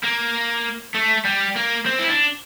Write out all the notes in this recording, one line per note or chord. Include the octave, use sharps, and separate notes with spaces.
A#3
A3
G3
A#3
C4
E4
D4